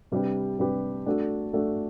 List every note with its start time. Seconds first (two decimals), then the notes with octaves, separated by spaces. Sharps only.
0.12 C3 G3 D4 G4 B4
0.59 C3 G3 D4 G4 B4
1.06 A3 D4 F#4 A4
1.53 A3 D4 F#4 A4